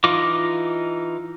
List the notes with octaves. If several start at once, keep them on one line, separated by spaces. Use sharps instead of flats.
E3 D#4 F4 D#5 D6